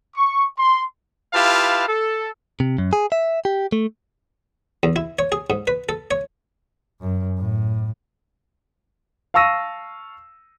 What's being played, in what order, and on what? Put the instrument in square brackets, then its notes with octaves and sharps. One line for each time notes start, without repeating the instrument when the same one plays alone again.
[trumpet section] C#6
C6
E4 F4 G4 B4 F5 A5
A4
[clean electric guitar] C3
F#2
G#4
E5
G4
A3
[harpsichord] E2
E4
C#5
G#4
G#2
B4
A4
C#5
[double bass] F#2
A2
[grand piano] F5 A5 C#6 E6 A#6 D#7